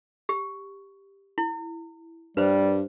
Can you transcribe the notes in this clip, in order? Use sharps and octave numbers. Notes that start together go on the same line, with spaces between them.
G4
E4
G2 G3 B4 C5